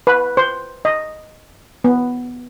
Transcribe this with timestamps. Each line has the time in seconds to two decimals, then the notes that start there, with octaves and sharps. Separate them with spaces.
0.07 B4
0.37 C5
0.85 D#5
1.84 B3